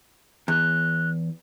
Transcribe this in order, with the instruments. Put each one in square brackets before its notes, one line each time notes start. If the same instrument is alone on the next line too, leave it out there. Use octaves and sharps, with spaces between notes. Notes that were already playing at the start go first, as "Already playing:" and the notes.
[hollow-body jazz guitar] E2 [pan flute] F#6